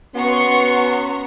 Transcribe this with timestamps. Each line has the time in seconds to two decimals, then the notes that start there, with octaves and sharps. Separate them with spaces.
0.15 B3 C#4 F#4 A#5 C6 C#6